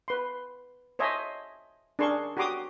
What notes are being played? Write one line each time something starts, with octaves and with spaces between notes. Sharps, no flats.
B4 C6
C5 C#5 D#5 E5 G#5 A5
D4 G#4 A#4 A5 C6 C#6
F#4 G4 A#5 C6 D6 D#6